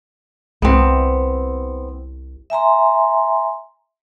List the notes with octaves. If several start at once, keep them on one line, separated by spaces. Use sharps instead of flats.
C2 B3 C4
E5 G#5 A#5 C6